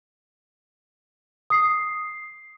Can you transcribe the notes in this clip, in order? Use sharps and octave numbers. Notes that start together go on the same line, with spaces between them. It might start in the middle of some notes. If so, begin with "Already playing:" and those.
D#6 C7